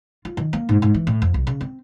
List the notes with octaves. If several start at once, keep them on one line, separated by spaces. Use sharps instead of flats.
F4
D#3
A#3
G#2
G#2
E3
A2
F2
C2
C#3
C4